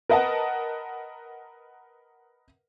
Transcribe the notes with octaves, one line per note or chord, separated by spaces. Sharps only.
A#4 B4 D#5 F#5 A5